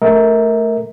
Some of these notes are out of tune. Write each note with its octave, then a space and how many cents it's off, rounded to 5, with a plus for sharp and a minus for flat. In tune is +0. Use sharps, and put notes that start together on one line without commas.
A3 +0 A#4 +0 E5 -35